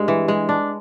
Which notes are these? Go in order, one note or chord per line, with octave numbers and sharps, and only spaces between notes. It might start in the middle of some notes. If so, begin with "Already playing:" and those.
Already playing: G2 G#3
E3
G#3
D4